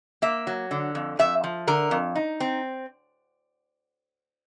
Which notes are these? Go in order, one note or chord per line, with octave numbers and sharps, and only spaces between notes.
A#3 E5
F#3
D3
F2
F2 E5
F3
D3 A#4
F2
D#4
C4